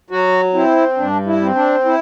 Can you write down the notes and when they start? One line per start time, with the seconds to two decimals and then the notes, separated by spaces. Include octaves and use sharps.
0.10 F#3 F#4
0.54 C4 E4
0.97 G2 D4
1.27 E4
1.42 C4
1.55 D4
1.85 E4